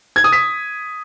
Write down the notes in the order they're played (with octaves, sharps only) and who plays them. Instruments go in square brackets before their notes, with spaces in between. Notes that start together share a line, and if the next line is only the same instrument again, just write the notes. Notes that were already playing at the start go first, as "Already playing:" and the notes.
[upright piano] G#6
D#6
B6